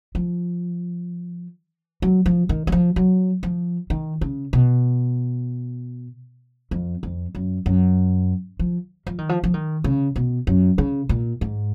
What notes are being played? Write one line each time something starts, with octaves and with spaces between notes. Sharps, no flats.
F3
F#3
F3
D#3
F#3
F3
F#3
F3
D#3
C#3
B2
F2
F2
F#2
F#2
F3
F3
D#3
F3
F3
D#3
C#3
B2
F#2
C#3
A#2
G#2